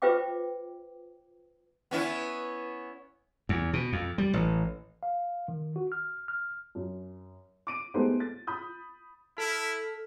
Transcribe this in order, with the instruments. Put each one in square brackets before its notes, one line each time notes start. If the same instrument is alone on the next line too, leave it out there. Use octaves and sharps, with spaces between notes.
[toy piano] F4 B4 C5 E5 G5 D6
[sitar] B3 C#4 E4
[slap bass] E2
B2
F2
G3
A1
[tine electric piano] F5
D#3
F#4
F6
F6
[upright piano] F#2
D6 D7 D#7
G#3 A3 B3 D#4 G4 C5
A6
B5 D#6 G6
[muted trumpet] E4 [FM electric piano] A4 F6 B6